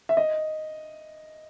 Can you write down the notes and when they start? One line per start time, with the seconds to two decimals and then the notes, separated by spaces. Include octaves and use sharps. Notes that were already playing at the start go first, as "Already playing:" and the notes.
0.09 E5
0.17 D#5